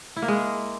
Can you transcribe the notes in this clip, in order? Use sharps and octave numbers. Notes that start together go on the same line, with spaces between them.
E4
A#3
G#3